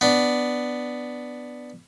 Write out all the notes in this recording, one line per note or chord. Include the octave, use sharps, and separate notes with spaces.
B3 D4